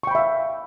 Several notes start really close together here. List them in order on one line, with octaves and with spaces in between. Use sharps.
C#6 G5 B5 E5 F5